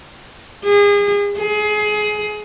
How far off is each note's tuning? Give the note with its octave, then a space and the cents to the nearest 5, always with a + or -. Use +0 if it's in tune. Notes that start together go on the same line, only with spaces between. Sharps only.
G#4 -35
G#4 +25